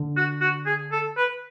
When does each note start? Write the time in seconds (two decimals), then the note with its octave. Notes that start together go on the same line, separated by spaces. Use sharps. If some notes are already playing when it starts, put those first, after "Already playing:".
Already playing: D3
0.17 F#4
0.41 F#4
0.66 G#4
0.92 A4
1.17 B4